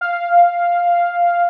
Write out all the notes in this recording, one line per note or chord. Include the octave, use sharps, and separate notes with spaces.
F5